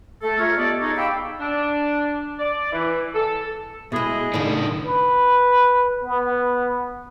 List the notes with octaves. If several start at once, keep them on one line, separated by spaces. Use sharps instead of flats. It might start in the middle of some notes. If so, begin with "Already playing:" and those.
A3 A4
F4 G#4 A#4 C#5 E5
B3 G4 A4 D5 D#5
D#4 G#4 A4 C#5 D#5
F5 G5 B5 D6 E6
D4
D5
E3
A4
B2 G#3 E4 G#4 D#5
A2 C#3 D4 D#4 A#4
B4
B3